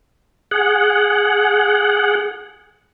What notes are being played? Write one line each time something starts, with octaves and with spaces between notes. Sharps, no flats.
G#4 F#5